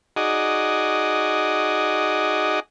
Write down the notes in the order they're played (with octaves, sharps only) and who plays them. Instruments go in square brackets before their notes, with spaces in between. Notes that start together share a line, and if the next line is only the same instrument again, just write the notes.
[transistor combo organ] D#4 F#4 G#4 D5 D#5